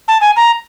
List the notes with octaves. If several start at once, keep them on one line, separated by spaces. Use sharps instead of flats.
A5
G#5
A#5